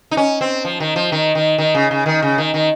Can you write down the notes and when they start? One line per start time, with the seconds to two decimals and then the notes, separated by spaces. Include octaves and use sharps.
0.11 D#4
0.17 C#4
0.41 C4
0.65 F3
0.80 D#3
0.96 F3
1.12 D#3
1.35 D#3
1.58 D#3
1.75 C#3
1.91 C#3
2.06 D#3
2.22 C#3
2.38 D#3
2.54 D#3